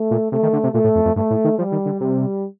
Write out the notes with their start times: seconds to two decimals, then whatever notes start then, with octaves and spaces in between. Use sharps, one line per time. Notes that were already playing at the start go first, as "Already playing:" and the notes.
Already playing: A3
0.11 A#2
0.32 C3 A3
0.43 D#3
0.53 D3
0.63 C3
0.74 A#2 A3
0.84 A2
0.95 F2
1.05 F2
1.16 G2 A3
1.30 A2
1.44 D#3
1.58 F3 G3
1.72 D#3
1.86 D3
2.00 C3 G3